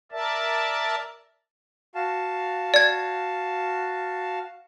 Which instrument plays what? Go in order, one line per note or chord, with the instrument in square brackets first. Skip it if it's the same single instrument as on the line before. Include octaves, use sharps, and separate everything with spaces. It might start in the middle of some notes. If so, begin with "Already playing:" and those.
[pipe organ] A#4 D5 E5 A5
[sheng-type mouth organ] F#4 F5 A5
[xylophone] D5 G#6